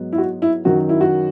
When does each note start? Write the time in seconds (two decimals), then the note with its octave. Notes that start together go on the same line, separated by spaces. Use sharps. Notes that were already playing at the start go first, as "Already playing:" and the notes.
Already playing: G#2 F#3 B3
0.13 E4
0.18 F#4
0.42 E4
0.65 F#2 D#3 F#3 F#4
0.89 E4
1.01 F#4